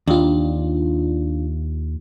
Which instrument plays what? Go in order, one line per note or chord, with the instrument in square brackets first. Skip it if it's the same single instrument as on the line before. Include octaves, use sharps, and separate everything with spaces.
[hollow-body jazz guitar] D#2 [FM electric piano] D4 F4